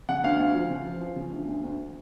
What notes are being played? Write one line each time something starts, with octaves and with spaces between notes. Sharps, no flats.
C#3 F#5
D2 F5
D2
F3
C#3
F3
F3
C#3
D2
D2
D2